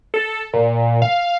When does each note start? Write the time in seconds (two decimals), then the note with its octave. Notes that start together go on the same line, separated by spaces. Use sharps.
0.14 A4
0.53 A#2
1.02 F5